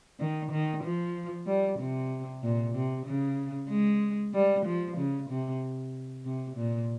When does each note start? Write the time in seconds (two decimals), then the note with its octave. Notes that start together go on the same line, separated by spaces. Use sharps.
0.20 D#3
0.51 D#3
0.83 F3
1.46 G3
1.79 C3
2.43 A#2
2.75 C3
3.06 C#3
3.69 G#3
4.34 G3
4.65 F3
4.97 C#3
5.29 C3
6.25 C3
6.56 A#2